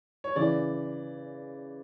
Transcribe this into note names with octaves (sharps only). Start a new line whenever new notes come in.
C#5
C#3 E3 D5